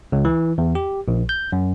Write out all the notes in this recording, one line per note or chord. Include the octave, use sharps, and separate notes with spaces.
C#2
E3
E2
G4
A#1
G6
F#2